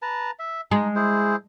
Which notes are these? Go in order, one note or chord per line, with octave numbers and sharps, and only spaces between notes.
B4 A5 A#5
E5
G#3 D#4
E4 G#4 C5